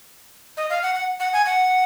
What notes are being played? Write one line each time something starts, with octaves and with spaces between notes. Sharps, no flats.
D#5
F5
F#5
F#5
F#5
G#5
F#5